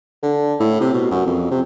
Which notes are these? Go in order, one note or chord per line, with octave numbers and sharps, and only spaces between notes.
D3
A2
C3
B2
F#2
F2
C3